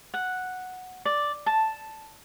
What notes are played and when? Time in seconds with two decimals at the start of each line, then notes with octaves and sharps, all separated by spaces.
0.14 F#5
1.05 D5
1.46 A5